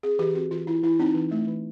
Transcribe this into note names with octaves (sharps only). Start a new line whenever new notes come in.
C4 G#4
E3 G4
C4 F#4
E3 F4
E3 E4
E3 E4
C4 D#4
E3
A3
E3